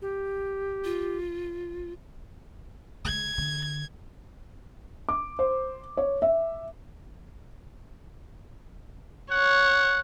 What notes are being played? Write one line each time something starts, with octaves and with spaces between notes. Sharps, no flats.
G4
F4
C#3 G#3 G#6
D3
D6
C5
C#5
E5
C#5 F#5